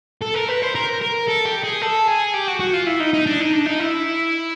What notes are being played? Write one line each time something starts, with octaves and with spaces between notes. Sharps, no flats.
A4
A#4
B4
C5
A#4
A#4
A4
G4
G#4
A4
G#4
G4
F#4
F#4
F4
E4
D#4
D#4
D4
D#4
D4
D#4
E4